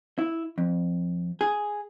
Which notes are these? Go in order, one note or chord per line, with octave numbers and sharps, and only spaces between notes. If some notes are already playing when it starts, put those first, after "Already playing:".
E4
F2
G#4